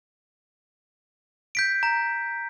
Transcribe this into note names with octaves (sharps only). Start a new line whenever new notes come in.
G6 B6 D7
A#5